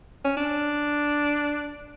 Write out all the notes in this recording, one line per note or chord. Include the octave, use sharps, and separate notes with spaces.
C#4
D4